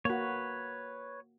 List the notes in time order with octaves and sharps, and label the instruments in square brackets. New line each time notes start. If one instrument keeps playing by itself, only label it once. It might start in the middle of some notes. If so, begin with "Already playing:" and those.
[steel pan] A#3 F#4 [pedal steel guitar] B4 C#5